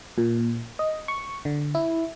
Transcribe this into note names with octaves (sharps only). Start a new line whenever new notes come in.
A#2
D#5
C#6
D3
E4